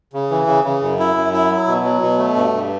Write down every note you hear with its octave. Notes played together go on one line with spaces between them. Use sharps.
C#3
E3
C#3
C#3
F#2
E4
F#2
E4
F#3
B2
F#3
B2
A3
G2
G2